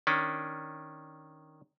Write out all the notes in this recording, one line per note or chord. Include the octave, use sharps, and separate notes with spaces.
D#3 C#4 D4